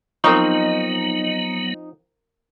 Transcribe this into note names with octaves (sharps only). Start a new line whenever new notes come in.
F3 F#3 B3 C4 D#4 A#4 A#5 C#6